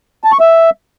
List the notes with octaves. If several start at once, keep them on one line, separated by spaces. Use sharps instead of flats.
A5
C#6
E5